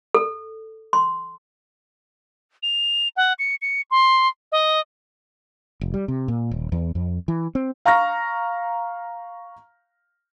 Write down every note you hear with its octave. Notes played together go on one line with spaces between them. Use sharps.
A4
C6
F7
F#5
C#7
C#7
C6
D#5
F1
G3
C3
A#2
D#1
E2
F2
E3
C4
F5 A#5 C#6 F6 A#6